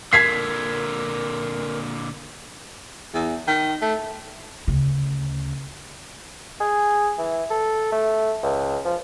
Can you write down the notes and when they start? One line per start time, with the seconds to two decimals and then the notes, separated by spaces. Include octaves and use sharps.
0.13 A#2 D3 A#4 G#6 B6 C7
3.14 E2
3.47 D#3
3.81 A3
4.68 D2 C#3
6.60 G#4
7.18 E3
7.50 A4
7.92 A3
8.43 C#2
8.85 F3